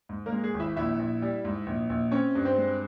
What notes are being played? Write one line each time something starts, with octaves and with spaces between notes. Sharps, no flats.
G#2
A#3 A#4
G#3
G#4
G#1
E4 E5
A#1 E4 E5
A#1
G3
G#2
A#1
A#1
C4 C#4 C#5
G2
C4 C5
G#3